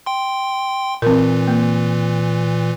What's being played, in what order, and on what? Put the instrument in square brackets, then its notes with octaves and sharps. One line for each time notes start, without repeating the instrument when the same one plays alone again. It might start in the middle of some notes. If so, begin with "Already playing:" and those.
[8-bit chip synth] G5 C6
[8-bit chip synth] A#2 E3 [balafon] C4 A#4
[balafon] A#3